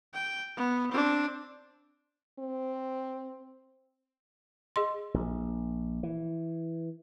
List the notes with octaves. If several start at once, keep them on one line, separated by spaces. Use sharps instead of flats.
G5
B3
C4 D4
C4
G#4 D#5 C6
A#1
E3